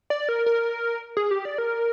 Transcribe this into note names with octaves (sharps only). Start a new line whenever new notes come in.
D5
A#4
A#4
G#4
G4
D5
A#4